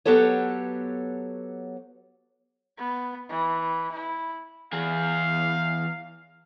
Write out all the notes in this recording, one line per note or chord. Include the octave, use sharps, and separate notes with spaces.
F#3 B3 G4 A4 C#5
B3
E3
E4
E2 G#4 F5